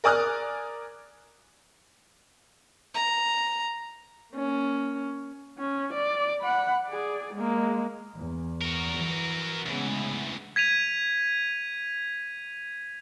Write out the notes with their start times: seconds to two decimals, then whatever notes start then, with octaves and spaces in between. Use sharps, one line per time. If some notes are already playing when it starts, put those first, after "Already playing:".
0.04 A#4 D5 G#5 D#6 F6 F#6
2.94 A#5
4.33 A#3 C#4
5.59 C#4
5.93 D5
6.41 F#5 B5
6.86 G#4 D5
7.33 G#3 A#3
8.16 E2
8.61 F#4 A#4
8.97 E3
9.66 D2 C#3 E3 G#3 B3
10.56 G#6 B6 D#7 F7